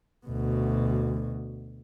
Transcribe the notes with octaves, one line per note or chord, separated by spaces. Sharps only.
D2 B2